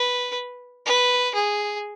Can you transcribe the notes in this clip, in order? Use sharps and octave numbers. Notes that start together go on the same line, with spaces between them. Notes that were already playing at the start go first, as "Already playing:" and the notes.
Already playing: B4
B4
G#4